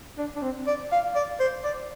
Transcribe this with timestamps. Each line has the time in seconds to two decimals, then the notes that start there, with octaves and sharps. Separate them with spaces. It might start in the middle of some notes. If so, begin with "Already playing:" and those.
0.18 D4
0.36 D4
0.43 C4
0.67 D5
0.92 F5
1.15 D5
1.40 C5
1.64 D5